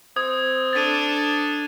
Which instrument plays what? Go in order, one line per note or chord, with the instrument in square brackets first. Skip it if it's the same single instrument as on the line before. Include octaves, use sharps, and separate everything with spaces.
[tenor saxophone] C4 [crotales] D#6 G#6
[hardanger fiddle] D4 A4 [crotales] A6 D#7